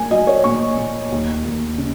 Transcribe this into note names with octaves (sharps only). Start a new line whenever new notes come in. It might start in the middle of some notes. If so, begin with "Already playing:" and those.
Already playing: A#3 G#5
F#3 D#5
C#5
A#2 C#6
A#2
D#2
D#2
C#3